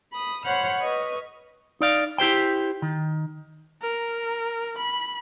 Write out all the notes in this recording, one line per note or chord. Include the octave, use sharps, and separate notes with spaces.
B5 D#6
C5 C#5 F#5 B5 F6 G6
B4 D#5 C#6 F6
D#4 D5 F5
E4 G4 C5 G5
D#3
A#4
B5